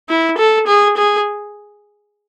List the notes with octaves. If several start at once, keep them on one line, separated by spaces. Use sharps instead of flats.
E4
A4
G#4
G#4